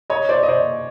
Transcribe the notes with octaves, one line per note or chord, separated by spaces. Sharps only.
C#5 D#5
C5 D5
D#5
C5 D5